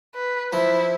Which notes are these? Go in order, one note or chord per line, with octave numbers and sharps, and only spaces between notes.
B4
F3 E4